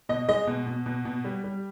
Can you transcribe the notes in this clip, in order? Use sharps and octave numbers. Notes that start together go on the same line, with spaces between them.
B2 D#5
G#3 D#5
B2
B2
B2
B2
G3
G3